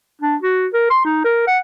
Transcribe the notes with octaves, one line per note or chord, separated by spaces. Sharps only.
D4
F#4
A#4
C6
D#4
A#4
F#5